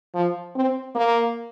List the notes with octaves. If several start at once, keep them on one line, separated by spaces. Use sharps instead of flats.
F3
C4
A#3